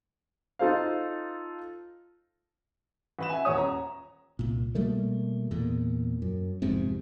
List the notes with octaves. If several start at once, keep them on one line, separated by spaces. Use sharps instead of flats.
D#4 F4 A4 C5 F5
A1 B4 E7
E5 G#5
D#1 A1 E2 C#4 C#5 D#6
A#5
C2 A#2
B2 G3 A3 A#3
E2 A#2
F#2
E1 F2 G#2 C3